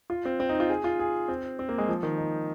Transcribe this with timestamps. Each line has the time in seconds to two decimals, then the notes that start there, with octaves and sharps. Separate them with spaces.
0.10 F4
0.25 C4
0.40 C4
0.49 D#4
0.60 F4
0.70 G#4
0.84 F4
0.99 G#4
1.28 C4
1.59 C4
1.69 A#3
1.78 G#3
1.89 F3
2.03 D#3
2.18 D#4